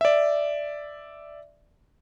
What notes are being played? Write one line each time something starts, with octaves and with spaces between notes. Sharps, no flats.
D5 E5